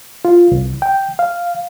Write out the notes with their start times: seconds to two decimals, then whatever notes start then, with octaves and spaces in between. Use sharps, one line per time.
0.25 F4
0.52 C2
0.82 G5
1.19 F5